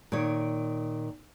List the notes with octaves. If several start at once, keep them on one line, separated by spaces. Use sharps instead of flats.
A#2 D#3 C#5